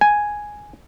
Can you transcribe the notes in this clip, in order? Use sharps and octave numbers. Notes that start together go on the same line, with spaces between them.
G#5